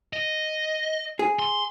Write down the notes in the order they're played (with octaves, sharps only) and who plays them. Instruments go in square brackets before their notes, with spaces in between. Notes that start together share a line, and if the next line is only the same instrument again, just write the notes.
[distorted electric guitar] D#5
[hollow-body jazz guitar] G#4
[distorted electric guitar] C6